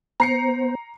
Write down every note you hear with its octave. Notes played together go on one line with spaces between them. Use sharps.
B3 C5 A#5 C7 C#7